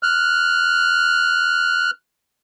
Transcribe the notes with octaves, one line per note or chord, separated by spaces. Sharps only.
F6 F#6